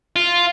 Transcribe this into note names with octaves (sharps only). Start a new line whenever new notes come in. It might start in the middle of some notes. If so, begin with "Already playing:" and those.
F4